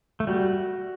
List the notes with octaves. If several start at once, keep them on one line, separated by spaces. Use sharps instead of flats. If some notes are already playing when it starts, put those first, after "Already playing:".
A3
G3 F#4